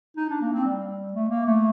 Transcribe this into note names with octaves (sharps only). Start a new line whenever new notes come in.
D#4
D4
A#3
C4
G3
A3
A#3
A3